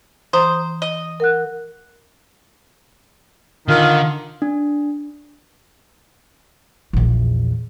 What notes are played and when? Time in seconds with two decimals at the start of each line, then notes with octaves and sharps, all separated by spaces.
0.33 E3 C5 A#5 D#6
0.82 D#5
1.20 A#4 F#5 F#6
3.68 D3 D#3 F4
4.42 D4
6.93 A#1 E2